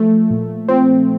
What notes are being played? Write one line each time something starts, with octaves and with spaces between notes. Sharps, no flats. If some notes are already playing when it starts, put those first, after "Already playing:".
Already playing: F3 A3
A#2
F3 C4